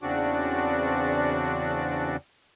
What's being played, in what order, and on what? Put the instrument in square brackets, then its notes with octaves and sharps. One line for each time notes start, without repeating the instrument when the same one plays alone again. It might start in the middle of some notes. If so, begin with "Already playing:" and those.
[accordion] E2 C#3 C4 D4 F#4 D5